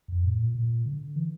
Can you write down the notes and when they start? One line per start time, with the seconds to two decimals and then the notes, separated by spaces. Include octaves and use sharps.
0.08 F2
0.23 A2
0.39 A#2
0.55 A#2
0.86 D3
1.16 E3